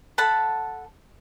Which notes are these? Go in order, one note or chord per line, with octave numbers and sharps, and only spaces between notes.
A4 F#5 A5 B5